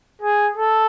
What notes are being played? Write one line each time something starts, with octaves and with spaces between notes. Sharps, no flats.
G#4
A4